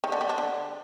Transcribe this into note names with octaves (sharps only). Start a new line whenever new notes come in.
D#3
D3
G3
D4
D3